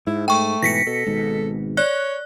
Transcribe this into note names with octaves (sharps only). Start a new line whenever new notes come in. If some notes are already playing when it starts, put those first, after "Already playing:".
G#2 E4
A3 G5 C#6
G#2 B2 E3 A#6 B6 C#7
B2 A4
G#1 G#2 B2
C#5 D5 F#6